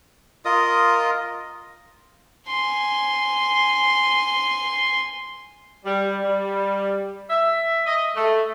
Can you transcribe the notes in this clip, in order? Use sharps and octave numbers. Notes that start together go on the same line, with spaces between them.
F4 A#4 D#5 D#6
G#5 C6
G3
G3
E5
D#5
A3